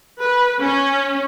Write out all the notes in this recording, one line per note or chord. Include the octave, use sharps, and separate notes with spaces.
B4
C#4